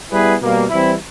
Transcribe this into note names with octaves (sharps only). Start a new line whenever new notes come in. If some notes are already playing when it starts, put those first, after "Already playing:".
G3 B3 E4 G#4 B4
B2 G3 A#3
E3 G3 C4 E4